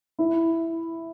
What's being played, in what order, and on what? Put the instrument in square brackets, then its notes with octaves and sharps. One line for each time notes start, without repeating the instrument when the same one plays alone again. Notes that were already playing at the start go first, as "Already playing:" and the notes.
[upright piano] E4